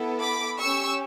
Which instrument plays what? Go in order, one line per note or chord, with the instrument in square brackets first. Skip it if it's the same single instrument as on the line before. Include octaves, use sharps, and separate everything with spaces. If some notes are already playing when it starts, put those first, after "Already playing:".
Already playing: [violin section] B3 E4 A4
B5 D6
C#4 G4 C#6 E6